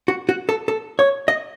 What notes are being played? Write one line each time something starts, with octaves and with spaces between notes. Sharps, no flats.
F#4
F#4
A4
A4
C#5
D#5